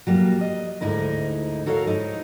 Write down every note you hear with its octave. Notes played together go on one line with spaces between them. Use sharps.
F#3 G3 A#3
D#5
D2 G#2 D#4 E4 A#4
F#4 A4 A#4 C#5 D#5 F5
G#2 D#4 E4